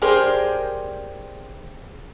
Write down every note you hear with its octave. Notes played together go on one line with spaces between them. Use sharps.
G4 G#4 A#4 C5 D5